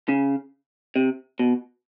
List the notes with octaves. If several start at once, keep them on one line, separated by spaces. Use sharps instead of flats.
C#3
C3
B2